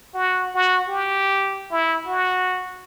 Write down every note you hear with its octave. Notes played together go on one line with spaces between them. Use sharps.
F#4
F#4
G4
E4
F#4